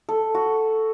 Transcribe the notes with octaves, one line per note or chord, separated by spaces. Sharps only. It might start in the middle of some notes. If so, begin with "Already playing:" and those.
A4
F#4